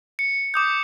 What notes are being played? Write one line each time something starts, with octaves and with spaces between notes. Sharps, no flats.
C#7
D6 D#6 G6